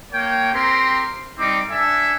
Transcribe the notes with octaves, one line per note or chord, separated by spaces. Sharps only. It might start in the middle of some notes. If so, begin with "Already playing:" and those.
A#3 C#5 G5
C4 G4 A#4 C6
G3 C4 D#4 D6
D4 A4 E5 G#5